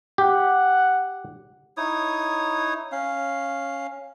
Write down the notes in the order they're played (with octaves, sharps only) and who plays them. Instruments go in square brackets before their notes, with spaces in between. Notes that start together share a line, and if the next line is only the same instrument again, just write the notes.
[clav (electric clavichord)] G4 [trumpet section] F#5
[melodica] D#4 E4 C#5 D#6
C#4 F5